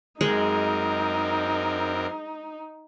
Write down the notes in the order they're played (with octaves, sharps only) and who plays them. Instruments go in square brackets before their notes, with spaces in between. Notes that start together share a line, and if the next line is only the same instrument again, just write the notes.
[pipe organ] F#2 C4 A#4 [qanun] G#3 [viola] D#4